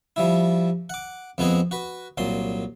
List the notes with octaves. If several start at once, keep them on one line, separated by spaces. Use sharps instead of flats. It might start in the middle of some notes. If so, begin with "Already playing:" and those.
F3 G3 E4
F#5 D6
F2 G#3 B3 C4 G#4 D#5
F#4 B4
C2 A#2 F#3 C6